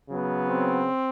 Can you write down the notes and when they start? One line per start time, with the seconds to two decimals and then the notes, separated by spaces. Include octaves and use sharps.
0.08 C#3 F#3 B3
0.48 C4